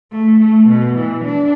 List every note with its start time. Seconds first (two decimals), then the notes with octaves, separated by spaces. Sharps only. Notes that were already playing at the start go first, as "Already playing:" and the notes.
0.12 A3
0.40 A3
0.68 B2
0.96 E3
1.25 D4